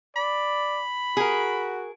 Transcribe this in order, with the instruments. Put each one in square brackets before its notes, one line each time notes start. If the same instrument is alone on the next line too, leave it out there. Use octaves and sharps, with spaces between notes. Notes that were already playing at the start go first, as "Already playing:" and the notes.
[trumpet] D5 [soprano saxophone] B5
[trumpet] F#4 [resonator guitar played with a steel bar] G#4 A#4